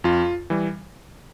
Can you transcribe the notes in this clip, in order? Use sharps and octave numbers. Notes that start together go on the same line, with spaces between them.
F2 F4
E3 G3